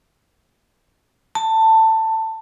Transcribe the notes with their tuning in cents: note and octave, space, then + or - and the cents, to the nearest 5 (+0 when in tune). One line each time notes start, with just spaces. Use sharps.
A5 +15